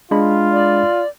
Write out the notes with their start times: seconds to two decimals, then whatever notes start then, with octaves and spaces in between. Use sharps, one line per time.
0.11 G#3 D4 F4 B5
0.52 D5